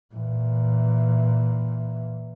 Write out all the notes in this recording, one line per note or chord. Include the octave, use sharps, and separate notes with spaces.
A#2 E3